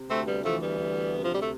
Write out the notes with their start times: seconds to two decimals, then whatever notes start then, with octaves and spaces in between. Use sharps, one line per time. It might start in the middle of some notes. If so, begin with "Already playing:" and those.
Already playing: C3
0.09 D2 A3 C4
0.26 G3 B3
0.44 E3 F3 A3
0.62 G3 B3
0.80 D2
1.15 C3
1.24 F3
1.33 G3
1.41 A3